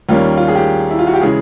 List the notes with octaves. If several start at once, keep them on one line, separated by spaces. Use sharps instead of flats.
D#2 D#3 G3 A#3 C#4 F4
F4
G#4
G4
E4
F4
F#4
G4
C#3 E3 G#3 G#4